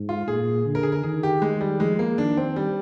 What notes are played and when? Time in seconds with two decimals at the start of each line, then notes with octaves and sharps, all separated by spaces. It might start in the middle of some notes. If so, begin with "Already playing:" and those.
Already playing: G#2
0.09 F4
0.28 A#2 G#4
0.66 D3
0.75 A#4
0.83 G#4
0.92 A#4
1.03 D#3 G#4
1.23 G4
1.42 D#3 G#3
1.61 G3
1.80 F3 G#3
1.99 A#3
2.18 D#3 D4
2.37 C4
2.56 G3